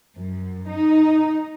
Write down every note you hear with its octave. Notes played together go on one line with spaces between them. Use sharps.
F#2
D#4